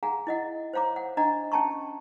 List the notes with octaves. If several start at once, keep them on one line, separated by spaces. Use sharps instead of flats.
G#4 F5 F#5 G#5 A#5
E4 D#5 F#5
C5 C#5 F5 A#5 D6
F#5
D4 D#5 F#5 A#5
C#4 G5 A5 A#5 C#6